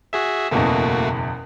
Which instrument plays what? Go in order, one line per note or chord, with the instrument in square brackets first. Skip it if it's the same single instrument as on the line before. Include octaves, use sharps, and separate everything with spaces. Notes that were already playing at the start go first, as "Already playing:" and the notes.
[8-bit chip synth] F#4 G#4 E5
[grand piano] F#1 E2 B2 [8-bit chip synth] A3 A#3 F#4